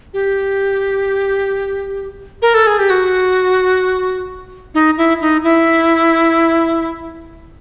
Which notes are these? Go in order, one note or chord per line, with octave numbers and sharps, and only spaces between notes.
G4
A#4
A4
G#4
G4
F#4
D#4
E4
D#4
E4